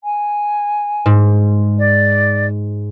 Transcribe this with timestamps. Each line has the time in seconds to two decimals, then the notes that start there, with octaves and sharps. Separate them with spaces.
0.04 G#5
1.06 G#2
1.79 D5